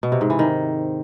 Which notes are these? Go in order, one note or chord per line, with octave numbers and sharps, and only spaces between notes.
B2
C3
G#2
E3
D#3